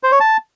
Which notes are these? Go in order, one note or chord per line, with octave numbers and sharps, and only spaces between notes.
C5
C#5
A5